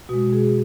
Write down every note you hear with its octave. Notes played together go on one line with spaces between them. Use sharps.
B2 G#3 F#4
G#4